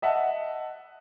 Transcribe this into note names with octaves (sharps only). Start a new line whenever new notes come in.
D#5 E5 F#5 A5